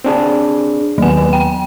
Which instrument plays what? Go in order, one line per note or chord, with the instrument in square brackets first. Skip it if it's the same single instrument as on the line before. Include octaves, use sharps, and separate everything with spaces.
[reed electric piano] C4 D4 G#4
[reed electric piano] D#2 B3 [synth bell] F#3 G#5
[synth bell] G5